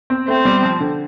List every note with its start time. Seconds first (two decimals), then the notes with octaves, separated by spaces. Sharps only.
0.10 C4
0.28 A3 C4
0.45 G3
0.63 F3
0.80 D3